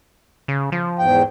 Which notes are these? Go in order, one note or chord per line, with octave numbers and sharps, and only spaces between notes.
C#3
F3
E2 G#2 G5